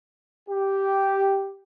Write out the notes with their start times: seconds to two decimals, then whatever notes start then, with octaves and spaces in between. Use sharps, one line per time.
0.49 G4